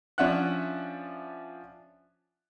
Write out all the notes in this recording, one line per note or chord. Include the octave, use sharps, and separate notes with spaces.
F3 C#4 D4 E5 F#5 F#6